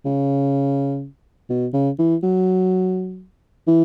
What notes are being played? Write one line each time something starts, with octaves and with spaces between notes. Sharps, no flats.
C#3
B2
C#3
E3
F#3
E3